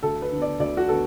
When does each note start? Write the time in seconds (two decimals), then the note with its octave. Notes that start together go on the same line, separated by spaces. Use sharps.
0.03 D2 A4
0.22 B4
0.32 D3 B3
0.42 D5
0.60 D2 D5
0.77 F#4
0.88 D3 B3 A4